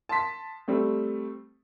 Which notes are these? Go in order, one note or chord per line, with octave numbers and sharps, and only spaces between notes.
A5 C6 B6
G3 A3 C4